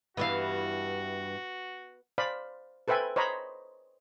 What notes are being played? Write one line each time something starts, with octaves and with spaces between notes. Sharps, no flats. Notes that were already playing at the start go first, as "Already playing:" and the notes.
G2 E3 B3 F#4 E5 F5
C5 D5 F5 B5
A4 B4 C5 E5 G5 G#5
C5 C#5 D#5 A#5 B5